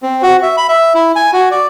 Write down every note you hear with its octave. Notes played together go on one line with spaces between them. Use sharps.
C4
F#4
E5
B5
E5
E4
G#5
F#4
D5